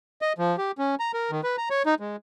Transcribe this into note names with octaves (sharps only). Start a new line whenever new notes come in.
D#5
F3
G4
C#4
A#5
A#4
D#3
B4
A#5
C#5
D#4
G#3